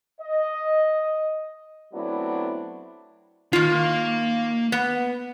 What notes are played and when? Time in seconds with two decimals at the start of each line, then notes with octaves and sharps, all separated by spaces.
0.21 D#5
1.93 F#3 A3 B3 C4 D4 E4
3.53 D#3 A#3 F4 F5
4.72 B3